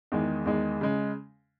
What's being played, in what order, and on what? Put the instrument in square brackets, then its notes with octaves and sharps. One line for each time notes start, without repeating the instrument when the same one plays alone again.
[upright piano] E2 D#3 G#3
E2 D#3 G#3
C#3 G#3